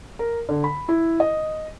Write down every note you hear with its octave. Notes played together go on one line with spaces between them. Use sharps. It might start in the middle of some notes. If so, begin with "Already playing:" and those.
A#4
D3
B5
E4
D#5